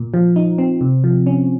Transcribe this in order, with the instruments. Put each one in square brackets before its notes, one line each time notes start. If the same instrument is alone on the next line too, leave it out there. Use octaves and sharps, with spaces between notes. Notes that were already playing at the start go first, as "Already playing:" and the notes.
Already playing: [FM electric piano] A#2
F3
D#4
C4
C3
F3
C#4